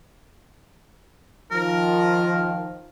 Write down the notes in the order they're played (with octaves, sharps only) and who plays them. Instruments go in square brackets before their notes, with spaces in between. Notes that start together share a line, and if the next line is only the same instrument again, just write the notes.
[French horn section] D#3 F3 [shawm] A#4